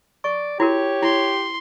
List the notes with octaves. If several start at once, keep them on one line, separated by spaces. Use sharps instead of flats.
D5 C#6
E4 F#4 G4 A#4 C#5
E4 C6